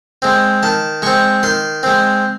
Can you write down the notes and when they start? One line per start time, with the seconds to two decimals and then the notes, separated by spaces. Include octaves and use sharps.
0.22 G#3 C4
0.63 D#3 A5
1.02 G#3 C4 C#6
1.43 D#3 C6
1.83 G#3 C4